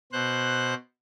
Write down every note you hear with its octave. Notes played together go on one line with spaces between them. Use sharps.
B2 C5 F#6